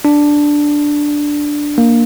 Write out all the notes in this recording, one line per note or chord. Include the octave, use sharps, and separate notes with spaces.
D4
A#3